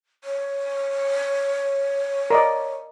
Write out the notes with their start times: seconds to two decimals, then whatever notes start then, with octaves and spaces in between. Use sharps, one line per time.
0.24 C#5
2.30 A#4 D5 D#5